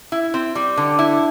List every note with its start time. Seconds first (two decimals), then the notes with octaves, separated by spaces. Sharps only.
0.12 E4
0.34 C4
0.55 G3
0.77 D3
0.99 E4